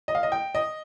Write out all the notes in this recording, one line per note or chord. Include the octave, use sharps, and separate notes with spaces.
D#5
F5
D#5
G5
D#5